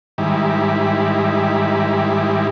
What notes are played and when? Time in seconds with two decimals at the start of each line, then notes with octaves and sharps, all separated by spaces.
0.18 G#2 D#3 G3 E4